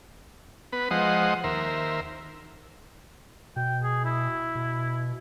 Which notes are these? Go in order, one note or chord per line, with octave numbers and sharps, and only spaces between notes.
B3 B4
F3 G#3 C5 D#5 F#5
D#2 A#4 C5 E5
B2 G5
G#4
E4
B2